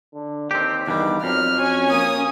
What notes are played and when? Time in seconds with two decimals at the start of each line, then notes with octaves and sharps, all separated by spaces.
0.14 D3
0.51 D#2 C4 G4
0.87 E2 G2 D#3 G3 D6
1.23 F2 F#3 F6
1.57 C#4 F#4 G#5
1.90 A#3 D#6